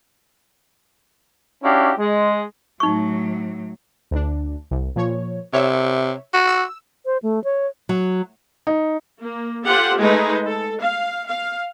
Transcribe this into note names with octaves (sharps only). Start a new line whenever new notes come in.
C#4 D4 E4 F#4 G4 F5
G#3
A2 F#3 D#4 C#6
D2 D4
C2
A#2 F3 C#5
C3 C#5 E5
F#4
E6
C5
A3
C#5
F#3
D#4
A#3
F4 G4 A4 C5 F#5
G#3 A3 D#4 G#4 B4
A4
F5
F5